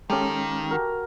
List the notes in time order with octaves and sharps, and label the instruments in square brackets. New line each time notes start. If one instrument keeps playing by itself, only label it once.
[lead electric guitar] D#3 [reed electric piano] G#3 C#4 [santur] G4 A4 F5
[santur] F#4 A#4